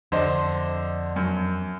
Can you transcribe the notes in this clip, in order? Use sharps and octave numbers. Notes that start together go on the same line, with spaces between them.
F2 D3 C5 D#5
F#2